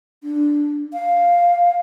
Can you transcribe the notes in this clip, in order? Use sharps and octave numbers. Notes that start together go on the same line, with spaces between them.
D4
F5